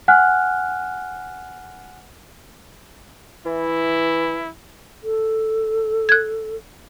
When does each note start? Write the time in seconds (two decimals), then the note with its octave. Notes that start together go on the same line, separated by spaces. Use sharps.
0.08 F#5 G#5 F6 F#6
3.46 E3 E4
5.04 A4
6.09 F#6 G#6